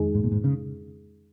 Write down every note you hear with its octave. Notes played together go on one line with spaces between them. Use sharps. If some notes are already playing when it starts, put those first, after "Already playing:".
Already playing: F2 D#3 G#3 D#4 G#4
G#2
A#2
G#2
C#3